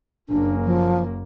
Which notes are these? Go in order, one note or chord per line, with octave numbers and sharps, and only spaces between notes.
F#1 A#3 D4
F3